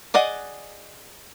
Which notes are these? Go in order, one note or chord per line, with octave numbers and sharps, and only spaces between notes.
G#4 D5 D#5 F#5